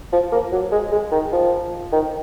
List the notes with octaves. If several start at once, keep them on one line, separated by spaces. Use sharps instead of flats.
F3
A#3
F#3
G#3
G#3
D#3
F3
D#3